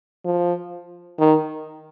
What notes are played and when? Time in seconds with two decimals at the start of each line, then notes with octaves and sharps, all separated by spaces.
0.25 F3
1.19 D#3